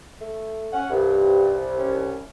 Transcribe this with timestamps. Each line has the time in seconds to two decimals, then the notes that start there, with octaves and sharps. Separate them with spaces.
0.21 A3
0.73 C#4 F#5
0.90 C2 G2
1.79 C#4